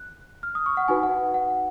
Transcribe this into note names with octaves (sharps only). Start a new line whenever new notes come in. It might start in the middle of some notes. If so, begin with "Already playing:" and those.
Already playing: F#6
F6
D#6
C#6
F#5
D#4 F#4 B4 G#5
F#5
F#5